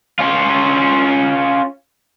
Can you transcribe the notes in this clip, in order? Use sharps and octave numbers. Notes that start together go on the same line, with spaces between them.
C#4 F4